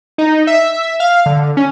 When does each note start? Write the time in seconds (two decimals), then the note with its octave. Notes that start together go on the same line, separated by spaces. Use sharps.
0.18 D#4
0.47 E5
1.00 F5
1.26 D3
1.57 C#4